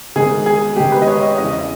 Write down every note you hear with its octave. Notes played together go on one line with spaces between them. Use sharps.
G#2 D#3 G#4
G#4
G#2 D#3 G4
B4
D#5
C#5
D#5
E2 C#3 E3 D#5
D#5